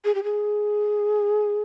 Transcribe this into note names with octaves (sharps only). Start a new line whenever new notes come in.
G#4
G4
G#4